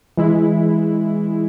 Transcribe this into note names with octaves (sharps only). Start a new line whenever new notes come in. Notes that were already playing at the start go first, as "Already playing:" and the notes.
E3 G#3 E4